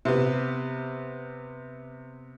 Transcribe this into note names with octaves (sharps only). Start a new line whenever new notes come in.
C3 B3